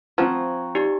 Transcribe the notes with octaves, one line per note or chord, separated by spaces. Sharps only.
F3 C4 F4 F#5 G5 A#5 C#6 G#6
D#4 G4 D5